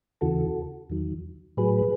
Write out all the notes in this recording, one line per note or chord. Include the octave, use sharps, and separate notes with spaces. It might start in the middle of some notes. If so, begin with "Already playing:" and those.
D#2 C#3 E3 F#4 A4
E2 D#3 F#3
A2 F#3 G#4 B4